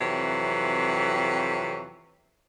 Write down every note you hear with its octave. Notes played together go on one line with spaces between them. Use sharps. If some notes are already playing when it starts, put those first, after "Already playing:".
F2 C3 E3 F#3